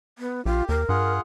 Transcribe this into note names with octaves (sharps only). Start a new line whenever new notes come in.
B3
A#1 F4 G4
D#2 A#4
G2 F4 G#4 F#5